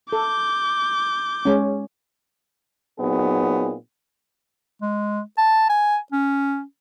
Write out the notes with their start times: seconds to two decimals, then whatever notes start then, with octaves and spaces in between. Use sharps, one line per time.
0.13 A4 D6 G6
1.45 G#3 C#4
2.99 A#2 F#3 B3 C4 D#4 G#4
4.82 G#3
5.38 A5
5.70 G#5
6.12 C#4